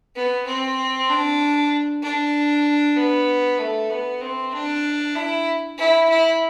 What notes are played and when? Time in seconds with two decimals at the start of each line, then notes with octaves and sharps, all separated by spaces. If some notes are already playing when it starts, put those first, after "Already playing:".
0.16 B3
0.47 C4
1.09 D4
2.03 D4
2.97 B3
3.59 A3
3.90 B3
4.21 C4
4.53 D4
5.16 E4
5.78 E4
6.09 E4